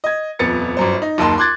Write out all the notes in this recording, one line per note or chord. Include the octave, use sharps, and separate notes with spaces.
D#5 G#6
D#1 F2 B3 A6 C#7
G1 F#2 C5
D#4
F#1 D#2 D#4 A5 C6
C6 D6 F#6 G#6 A6